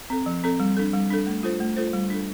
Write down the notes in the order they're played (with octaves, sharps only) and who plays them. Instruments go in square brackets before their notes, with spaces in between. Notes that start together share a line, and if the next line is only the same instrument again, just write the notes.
[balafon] C4 A4
F3
C4 A4
G3
D4 A4
G3
D4 A4
A3
F4 A4 C5
A3
F4 A4 C5
G3
D4 A4